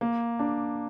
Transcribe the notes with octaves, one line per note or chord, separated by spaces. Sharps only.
A#3
D4